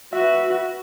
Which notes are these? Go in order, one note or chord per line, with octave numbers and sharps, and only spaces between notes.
F#4 B4 E5